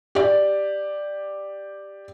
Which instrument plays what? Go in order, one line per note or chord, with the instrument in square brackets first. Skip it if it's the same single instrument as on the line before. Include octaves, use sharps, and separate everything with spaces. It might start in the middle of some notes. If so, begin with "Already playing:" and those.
[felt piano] G4 D5